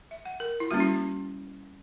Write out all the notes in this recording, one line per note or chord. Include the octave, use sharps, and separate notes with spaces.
E5
F#5
A#4
E4
G3 A#3 C#4 F#4
E4